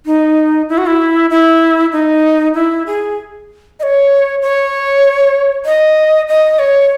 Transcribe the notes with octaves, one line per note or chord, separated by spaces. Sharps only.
D#4
E4
F#4
E4
E4
D#4
E4
G#4
D#5
C#5
C#5
D#5
D#5
C#5